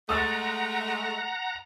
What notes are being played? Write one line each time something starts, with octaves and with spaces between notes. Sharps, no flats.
G#3 A3 F#5 A#5 D#6 E6 A6